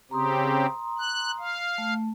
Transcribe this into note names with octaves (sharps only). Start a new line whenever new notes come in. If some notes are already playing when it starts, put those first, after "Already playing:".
C#3 C4 G4 A#5 C6 D#6
F#6
F5
A3